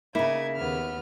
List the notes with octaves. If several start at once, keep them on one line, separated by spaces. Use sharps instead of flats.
C#3 A#3 D#4 E4 G#6
D#2 B3 F6